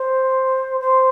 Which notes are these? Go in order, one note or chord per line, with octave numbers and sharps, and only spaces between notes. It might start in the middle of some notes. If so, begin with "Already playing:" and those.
Already playing: C5
C5